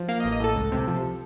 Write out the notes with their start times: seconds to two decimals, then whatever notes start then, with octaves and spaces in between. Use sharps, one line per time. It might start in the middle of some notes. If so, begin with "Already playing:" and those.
Already playing: F3
0.08 A#3 F5
0.20 D#5
0.24 A1
0.32 D#5
0.40 A2 A4
0.56 C#2
0.72 C3
0.87 F3